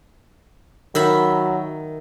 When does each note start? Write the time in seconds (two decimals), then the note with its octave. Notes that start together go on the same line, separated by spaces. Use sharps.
0.95 D#3 F#3 E5 B5